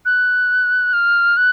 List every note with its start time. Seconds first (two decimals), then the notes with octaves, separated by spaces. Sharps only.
0.05 F#6
0.93 F6
1.37 F#6